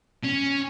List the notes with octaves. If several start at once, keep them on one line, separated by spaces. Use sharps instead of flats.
C#4